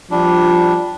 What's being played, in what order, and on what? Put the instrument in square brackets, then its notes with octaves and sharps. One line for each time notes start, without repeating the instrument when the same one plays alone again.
[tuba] F3 [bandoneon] G3 D4